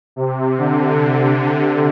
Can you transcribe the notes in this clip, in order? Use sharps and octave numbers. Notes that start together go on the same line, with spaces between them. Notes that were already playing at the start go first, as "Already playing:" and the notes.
C3
D3